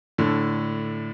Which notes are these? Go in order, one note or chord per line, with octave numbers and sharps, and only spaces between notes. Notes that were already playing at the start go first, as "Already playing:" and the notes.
A2 D3